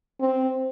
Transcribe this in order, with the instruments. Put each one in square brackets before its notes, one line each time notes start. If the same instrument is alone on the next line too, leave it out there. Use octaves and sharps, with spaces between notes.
[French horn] C4